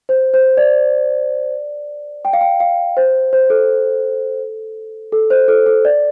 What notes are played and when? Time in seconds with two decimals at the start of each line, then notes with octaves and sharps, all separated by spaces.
0.09 C5
0.34 C5
0.57 D5
2.25 G5
2.33 F5
2.41 G5
2.60 F5
2.97 C5
3.33 C5
3.50 A4
5.12 A4
5.30 C5
5.48 A4
5.66 A4
5.85 D5